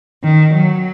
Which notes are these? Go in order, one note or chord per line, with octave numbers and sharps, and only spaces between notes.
D#3
F#3